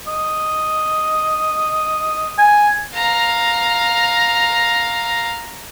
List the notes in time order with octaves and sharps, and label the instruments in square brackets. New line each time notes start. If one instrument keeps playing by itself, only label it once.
[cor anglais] D#5
[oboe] G#5
[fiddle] F5 A#5